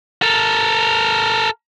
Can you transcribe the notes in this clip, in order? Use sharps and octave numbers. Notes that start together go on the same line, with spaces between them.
A4 A#4